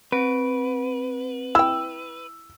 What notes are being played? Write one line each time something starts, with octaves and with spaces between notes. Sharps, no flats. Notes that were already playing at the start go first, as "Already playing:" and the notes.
C4 B4 D7
E4 G5 E6